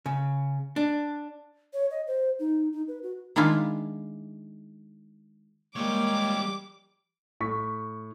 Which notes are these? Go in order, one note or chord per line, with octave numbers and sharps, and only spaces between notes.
C#3
D4
C#5
D#5
C5
D#4
D#4
B4
F#4
D#3 G#3 D4 E4 F4
G3 G#3 A#3 C#5 D6
A2 C#6 B6